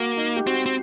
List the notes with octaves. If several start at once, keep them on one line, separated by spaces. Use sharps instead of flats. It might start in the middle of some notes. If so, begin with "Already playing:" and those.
Already playing: A#3 F#4
D#4
G4
C4 F#4
C4